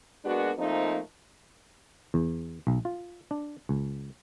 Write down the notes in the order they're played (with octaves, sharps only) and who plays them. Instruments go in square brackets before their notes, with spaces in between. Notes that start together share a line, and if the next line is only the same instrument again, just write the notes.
[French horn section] G#3 A#3 B3 D4 F#4
F3 A3 A#3 C4 D#4
[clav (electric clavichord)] E2
B1
F4
D4
C#2